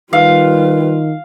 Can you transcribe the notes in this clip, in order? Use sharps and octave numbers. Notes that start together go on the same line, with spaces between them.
D#3 G3 F4 B4 F5